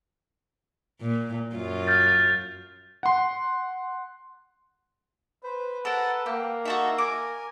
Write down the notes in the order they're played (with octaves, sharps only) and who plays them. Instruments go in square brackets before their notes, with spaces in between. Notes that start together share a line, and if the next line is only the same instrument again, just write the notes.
[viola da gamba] A#2
F#2 F4
[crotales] F6 G6 A6
[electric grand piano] F#5 C6
[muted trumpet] B4 [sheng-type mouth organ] C5
[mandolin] A4 A#4 [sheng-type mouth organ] F#5 A5
[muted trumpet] A#3 [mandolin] G4 [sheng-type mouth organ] F#5
[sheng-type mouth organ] D#4 C#6 [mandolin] F#4 A4 E5
[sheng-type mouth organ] A#4 G#5 [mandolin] D6